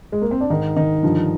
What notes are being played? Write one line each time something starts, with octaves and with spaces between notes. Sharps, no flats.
G#3
A#3
C4
D4
G#2 D#3 D#4
D#3 D#4
G2 D3 F3